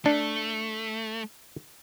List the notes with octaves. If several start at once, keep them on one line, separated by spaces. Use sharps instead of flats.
A3 D4